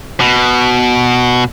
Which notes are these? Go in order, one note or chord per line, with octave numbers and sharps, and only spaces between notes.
B2